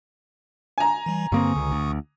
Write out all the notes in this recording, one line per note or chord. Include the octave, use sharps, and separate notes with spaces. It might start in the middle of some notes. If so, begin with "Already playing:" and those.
G#5 A#5
E3 G3
G2 D3 A#3 C4 C#6 D#6
C#2
D2